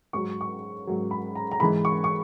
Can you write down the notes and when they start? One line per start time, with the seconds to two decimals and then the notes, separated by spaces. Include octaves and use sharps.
0.13 G#2 F#3 C#6
0.41 C#6
0.87 G#2 F#3
1.11 B5
1.35 A#5
1.51 A#5
1.60 G#2 E3 G#3 B5
1.85 C#6
2.04 C#6